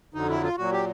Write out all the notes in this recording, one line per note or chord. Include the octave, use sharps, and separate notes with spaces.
F2 D3 F#3 D#4
E4
F4
A#2 F#3 F#4
G4